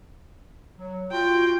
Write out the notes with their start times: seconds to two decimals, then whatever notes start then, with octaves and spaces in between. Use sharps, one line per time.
0.79 F#3
1.12 F4 F#4 G5